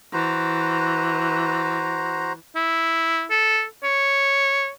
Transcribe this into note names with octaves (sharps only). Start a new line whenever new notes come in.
E3 F#4 C5 A#5
E4
A4
C#5